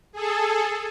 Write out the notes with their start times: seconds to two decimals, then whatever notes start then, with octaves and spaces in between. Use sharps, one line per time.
0.12 G#4 A4